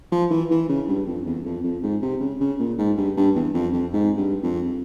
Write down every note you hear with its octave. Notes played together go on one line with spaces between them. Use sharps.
F3
E3
E3
C#3
G2
F2
E2
F2
F2
G#2
C3
C#3
C#3
A#2
G#2
G2
G2
E2
F2
F2
G#2
G2
F2